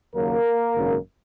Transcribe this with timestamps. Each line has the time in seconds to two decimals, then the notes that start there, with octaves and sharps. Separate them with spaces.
0.15 D#2 C#3 F#3 A#3 A#4
0.76 G#1 F#2 C#3